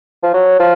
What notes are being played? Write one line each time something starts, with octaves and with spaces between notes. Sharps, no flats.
F3
F#3
F3